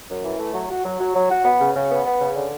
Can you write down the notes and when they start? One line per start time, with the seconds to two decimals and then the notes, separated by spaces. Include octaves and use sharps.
0.09 F#2
0.24 E3
0.39 A3
0.54 F#3
0.69 F#4
0.85 F#3
1.00 F#3
1.15 F#3
1.30 F#4
1.44 B3
1.60 C#3
1.75 C#3
1.90 B3
2.05 B3
2.20 C#3
2.35 D3